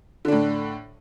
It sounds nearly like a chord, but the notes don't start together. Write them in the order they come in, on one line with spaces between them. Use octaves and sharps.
D3 D4 A2